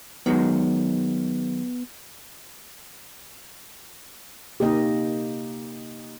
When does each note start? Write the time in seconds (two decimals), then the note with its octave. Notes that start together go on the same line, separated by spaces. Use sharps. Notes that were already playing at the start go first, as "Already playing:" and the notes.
0.26 D#3 F#3 G#3 B3
4.60 C3 A#3 D#4 G4 D#5